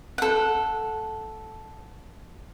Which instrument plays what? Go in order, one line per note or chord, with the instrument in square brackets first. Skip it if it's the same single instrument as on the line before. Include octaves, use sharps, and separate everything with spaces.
[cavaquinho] A4 F#5